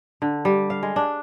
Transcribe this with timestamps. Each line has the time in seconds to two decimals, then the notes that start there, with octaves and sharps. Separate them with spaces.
0.22 D3
0.45 G3
0.70 F5
0.83 G#3
0.96 D4